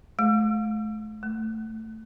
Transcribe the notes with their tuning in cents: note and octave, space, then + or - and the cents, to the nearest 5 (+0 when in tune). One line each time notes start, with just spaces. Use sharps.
A3 -35
A3 +15